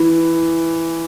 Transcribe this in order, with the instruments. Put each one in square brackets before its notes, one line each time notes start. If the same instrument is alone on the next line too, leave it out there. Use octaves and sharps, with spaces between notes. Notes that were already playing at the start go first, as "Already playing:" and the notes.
Already playing: [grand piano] E3